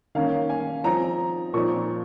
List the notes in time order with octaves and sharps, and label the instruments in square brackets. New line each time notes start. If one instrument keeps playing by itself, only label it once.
[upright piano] D#3 A#3 C#4 F5
G#5
F3 C4 D#4 A#5
A#2 F3 C4 D#4 C#6